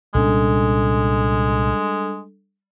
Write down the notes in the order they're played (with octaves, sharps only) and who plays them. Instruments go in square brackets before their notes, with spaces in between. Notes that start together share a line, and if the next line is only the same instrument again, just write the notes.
[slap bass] C2 A#2 C#4 [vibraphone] G3 D4 A4 [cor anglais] G#3